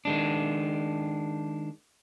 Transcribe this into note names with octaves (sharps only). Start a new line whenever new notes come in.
D#3 G#3 D4